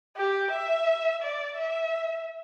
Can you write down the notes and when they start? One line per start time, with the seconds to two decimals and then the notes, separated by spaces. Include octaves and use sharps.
0.16 G4
0.51 E5
1.22 D5
1.57 E5